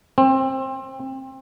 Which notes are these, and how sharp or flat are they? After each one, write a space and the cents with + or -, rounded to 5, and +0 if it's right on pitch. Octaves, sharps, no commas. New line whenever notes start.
C4 +25